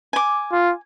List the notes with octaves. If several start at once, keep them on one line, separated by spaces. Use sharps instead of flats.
G#5 D6
F4